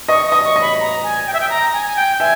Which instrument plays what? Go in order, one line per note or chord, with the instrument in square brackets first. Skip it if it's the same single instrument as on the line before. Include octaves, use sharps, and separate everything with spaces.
[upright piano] D#5 [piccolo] C#6
[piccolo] D#6
[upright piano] D#5
[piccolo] C#6
[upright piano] D#5
[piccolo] B5
A#5
G#5
G5
E5
G5
A#5
G#5
G#5
G5
[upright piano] E5 [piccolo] G#5